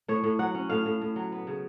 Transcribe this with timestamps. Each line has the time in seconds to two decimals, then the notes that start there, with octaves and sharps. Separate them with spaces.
0.08 A2 C#5
0.24 A2
0.39 F#3 F#5
0.55 C#4
0.69 A2 F5
0.86 A2
1.01 A2
1.16 F#3
1.32 B3
1.47 C#3